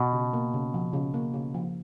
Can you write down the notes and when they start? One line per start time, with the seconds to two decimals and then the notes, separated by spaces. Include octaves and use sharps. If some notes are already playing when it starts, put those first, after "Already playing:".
Already playing: B2
0.13 C#3
0.33 A#3
0.54 C#3
0.74 F3
0.93 C#3
1.14 A#3
1.34 C#3
1.54 F3